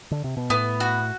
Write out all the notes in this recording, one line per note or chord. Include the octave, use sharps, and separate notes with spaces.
D3
C3
B2
A2 B3
F#4